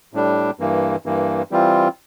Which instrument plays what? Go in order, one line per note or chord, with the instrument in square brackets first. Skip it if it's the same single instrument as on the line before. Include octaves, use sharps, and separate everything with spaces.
[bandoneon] A2 G3 D4
G2 E3 A#3
G2 E3 A#3
E3 G3 C4 F4